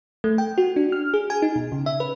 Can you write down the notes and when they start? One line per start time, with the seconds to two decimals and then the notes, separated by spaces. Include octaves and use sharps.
0.24 A3
0.38 G5
0.58 F#4
0.76 D4
0.92 F6
1.14 G#4
1.30 G#5
1.42 D#4
1.56 B2
1.72 C#3
1.86 E5
2.00 B4